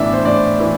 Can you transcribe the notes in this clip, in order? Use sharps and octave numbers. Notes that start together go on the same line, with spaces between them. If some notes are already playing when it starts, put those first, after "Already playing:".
Already playing: A2 E3 B3 D4 E5
C5
A2 D5
E3